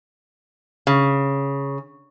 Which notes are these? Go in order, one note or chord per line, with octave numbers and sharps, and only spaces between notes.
C#3